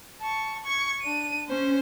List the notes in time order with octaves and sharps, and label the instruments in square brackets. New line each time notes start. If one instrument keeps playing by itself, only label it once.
[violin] A5 C#6
C#6 G#6
D4 D#7
[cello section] C#4 [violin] C5